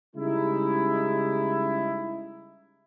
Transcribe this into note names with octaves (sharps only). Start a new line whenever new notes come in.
C#3 G3 G#3 D#4 E4